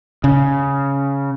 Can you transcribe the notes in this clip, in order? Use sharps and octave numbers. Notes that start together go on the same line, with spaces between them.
C#3